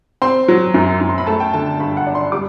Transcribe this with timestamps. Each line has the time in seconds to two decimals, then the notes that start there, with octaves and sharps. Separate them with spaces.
0.22 C4 C6
0.48 F#3
0.74 F#2
1.01 F#2
1.09 C6
1.18 B5
1.27 A3 A5
1.40 G5
1.53 D3 A5
1.80 G2 B5
1.97 F#5
2.07 D4
2.15 C6
2.32 G3 D6